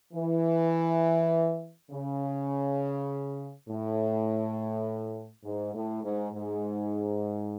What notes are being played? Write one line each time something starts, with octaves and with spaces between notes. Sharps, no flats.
E3
C#3
A2
G#2
A2
G#2
G#2